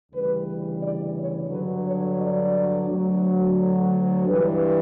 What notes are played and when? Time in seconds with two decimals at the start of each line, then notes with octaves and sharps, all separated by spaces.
0.11 D2 C#3 E3 G3 B4
0.80 D5
1.15 C#5
1.50 G2 D3 F#3 B4
1.85 C#5
2.19 D5
2.89 D2 D3 F#3
4.28 G2 E3 G3 B4